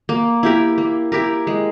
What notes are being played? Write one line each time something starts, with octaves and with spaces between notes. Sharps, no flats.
A#3
E4 G4 A#4
A#3
E4 G4 A#4
G#3